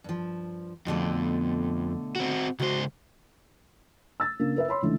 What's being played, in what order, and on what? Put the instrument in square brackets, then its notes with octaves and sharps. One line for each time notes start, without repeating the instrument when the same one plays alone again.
[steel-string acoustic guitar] G2 F3
[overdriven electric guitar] F2 [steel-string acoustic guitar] B2 D3 A3
[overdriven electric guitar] C4 F#4
[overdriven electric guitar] C#2 C5 [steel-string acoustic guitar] F#4 D#5
[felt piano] E6 A6
C#3 A#3 D4
A#4 B4 E5
C#5 B5 C6
C#2 D3 E3 A3